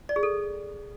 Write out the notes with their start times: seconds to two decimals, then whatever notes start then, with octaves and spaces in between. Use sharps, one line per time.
0.09 D5
0.16 G#4
0.23 A4